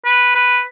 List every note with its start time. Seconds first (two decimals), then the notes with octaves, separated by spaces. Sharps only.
0.05 B4
0.35 B4